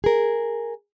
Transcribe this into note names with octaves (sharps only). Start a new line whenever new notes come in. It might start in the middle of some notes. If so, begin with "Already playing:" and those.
G#4 A#4